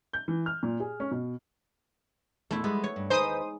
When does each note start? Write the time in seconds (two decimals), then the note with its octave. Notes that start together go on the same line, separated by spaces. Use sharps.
0.13 G6
0.28 E3
0.46 F6
0.63 A#2
0.80 G#4
1.00 C#4
1.11 B2
2.51 E2 A#2 A3 E4
2.64 G3 G#3 B3
2.84 C#5
2.96 G2
3.10 D#2 G#3 D#4 B4 C5 D#6